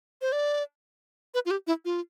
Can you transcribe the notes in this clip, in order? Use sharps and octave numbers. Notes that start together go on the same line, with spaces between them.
C5
D5
B4
F4
G4
E4
F4